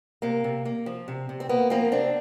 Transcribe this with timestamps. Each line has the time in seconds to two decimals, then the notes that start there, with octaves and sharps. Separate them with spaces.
0.22 C3 A#3
0.44 C3
0.65 A#3
0.86 F3
1.08 C3
1.29 C3
1.40 C4
1.49 A#3 B3
1.70 F3 A#3 C4
1.92 C3 C4 D4